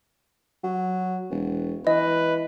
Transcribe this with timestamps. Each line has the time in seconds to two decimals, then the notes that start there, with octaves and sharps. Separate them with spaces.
0.64 F#3
1.30 E1
1.87 E3 B4 D#5